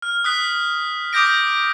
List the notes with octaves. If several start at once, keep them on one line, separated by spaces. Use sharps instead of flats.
F6
D#6 F#6 B6
D6 D#6 G6 A#6 D7